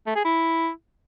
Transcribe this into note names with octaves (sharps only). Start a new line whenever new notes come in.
A3
G#4
E4